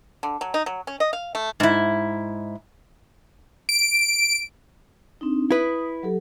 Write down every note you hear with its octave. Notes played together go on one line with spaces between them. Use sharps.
D3
F#3
D#4
F#3
C#4
D#5
F5
A3
G#2 E4
D7
C4 D4 D#4
E4 B4 D#6
F#3 G4 A4